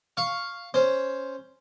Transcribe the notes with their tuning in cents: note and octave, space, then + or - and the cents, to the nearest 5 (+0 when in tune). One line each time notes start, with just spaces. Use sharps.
F5 +0 C#6 +0
C#4 +0 C5 +0